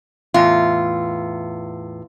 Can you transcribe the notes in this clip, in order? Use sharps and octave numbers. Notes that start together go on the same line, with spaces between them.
E2 A2 F4